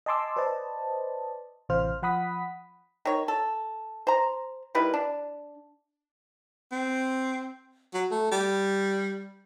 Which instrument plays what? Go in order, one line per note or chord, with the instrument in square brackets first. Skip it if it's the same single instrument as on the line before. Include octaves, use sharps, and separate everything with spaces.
[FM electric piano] D#5 G#5 A5 C6 D6 E6
B4 C5 D5 D#5 A5
A1 C3 E3 C5 F5 F6
F3 F#5 B5 D#6 B6
[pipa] D#3 C#5
A4
C5 A#5
D#3 G3 E4 B4
D4
[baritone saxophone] C4
F#3
A3
G3